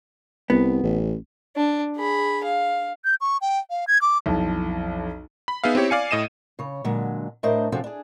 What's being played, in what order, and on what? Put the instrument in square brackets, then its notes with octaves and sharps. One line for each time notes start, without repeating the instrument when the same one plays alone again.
[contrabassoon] C2 [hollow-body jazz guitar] B3
[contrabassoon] A1
[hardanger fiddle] D4
G#4 B5
F5
[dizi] G6
C#6
G5
F5
G#6
D6
[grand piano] B1 F2 E3 A5
[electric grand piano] B5
B3 D#4 G#4 E5 F5
C4 E4 G4 C#5
D5 F5 G#5 C#7
A2 D#5 D#7 E7
[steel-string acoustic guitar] C#3 C#5
A#2 D3 F#3 G#3
A2 A3 D4 A#4 C5 D#5
C3 F3 C4 C#4 F#4 A4
D4 G#4